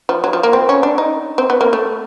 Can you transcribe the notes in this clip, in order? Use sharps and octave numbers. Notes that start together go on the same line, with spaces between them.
F3
F#3
F3
A#3
C4
C#4
D4
D#4
C4
B3
A#3
A3